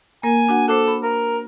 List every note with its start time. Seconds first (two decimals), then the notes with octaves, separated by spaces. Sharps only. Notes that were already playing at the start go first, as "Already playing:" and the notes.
0.23 A#3 A#4 G#5
0.49 D4 F#4 F#5
0.68 A4 C5 D6 F#6
0.87 B5
1.03 A#4